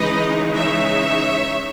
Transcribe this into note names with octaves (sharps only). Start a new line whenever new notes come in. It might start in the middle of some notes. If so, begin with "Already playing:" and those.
Already playing: C#3 E3 G#3 D#4 B4 D#5
C#5 E5